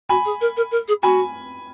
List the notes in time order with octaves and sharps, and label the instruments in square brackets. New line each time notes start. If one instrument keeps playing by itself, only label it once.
[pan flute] F#4 [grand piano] G#5 B5
[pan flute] G#4
A#4
A#4
A#4
G#4
[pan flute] F#4 [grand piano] G#5 B5